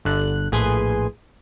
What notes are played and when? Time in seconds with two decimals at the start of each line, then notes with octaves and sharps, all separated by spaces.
0.05 G1 D3 F#6
0.52 A#1 A2 G#4 B4 G#5 C6